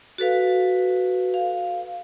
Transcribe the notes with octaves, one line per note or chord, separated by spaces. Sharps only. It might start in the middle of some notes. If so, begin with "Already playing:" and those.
F#4 A4 B4 F5
F5